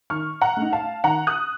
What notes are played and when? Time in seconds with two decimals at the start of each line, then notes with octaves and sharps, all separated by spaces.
0.10 D#3 C#6 F6
0.41 F#5 A#5
0.57 A3
0.62 D#4
0.73 F5 A5
1.04 D#3 F#5 A#5
1.27 D#6 F#6